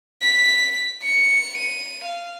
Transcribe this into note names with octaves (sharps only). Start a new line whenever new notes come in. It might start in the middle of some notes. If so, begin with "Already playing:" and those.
B6
C#7
D#7
F5